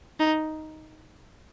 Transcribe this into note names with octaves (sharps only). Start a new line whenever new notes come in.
D#4